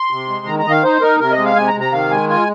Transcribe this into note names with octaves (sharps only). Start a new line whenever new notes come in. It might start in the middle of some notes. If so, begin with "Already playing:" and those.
Already playing: C6
C3
G#3
D#3 A#5
A#5
D#3 D#5
F5
D#4 C5
D#4 A#4
C3 A#4
D#5
G#3
F5
C3 G#5
A#5
C3
A#5
D#3 F5
G#3 G#5
F4 G#5